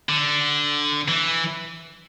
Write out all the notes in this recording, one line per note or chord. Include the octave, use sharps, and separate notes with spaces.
D3
E3